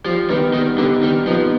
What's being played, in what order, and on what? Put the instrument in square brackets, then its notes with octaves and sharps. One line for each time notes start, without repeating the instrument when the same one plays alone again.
[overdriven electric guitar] F3 [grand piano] G3
[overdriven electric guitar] D#3 [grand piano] B3 D#4 G4 B4
[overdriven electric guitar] D#3 [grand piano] G3
[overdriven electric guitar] D3 [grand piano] B3 D#4 G4 B4
[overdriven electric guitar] D#3 [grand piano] G3
[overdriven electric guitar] F3 [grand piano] B3 D#4 G4 B4